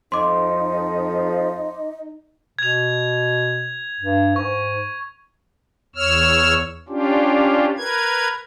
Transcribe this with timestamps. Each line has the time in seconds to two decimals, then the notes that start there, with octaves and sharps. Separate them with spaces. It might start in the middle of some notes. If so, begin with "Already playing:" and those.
0.12 F2 F3 D#4 D#5 C6 D6
2.59 B2 G#6 F7
4.01 G2
4.36 G#2 C#6
5.96 E2 C#5 E6 F6
6.89 C#4 D4 F4 G4
7.77 A#4 B4 G#6